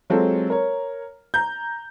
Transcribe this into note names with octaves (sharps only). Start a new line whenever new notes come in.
F#3 G#3 C4 F4 A4
A#4 C#5
A#5 G6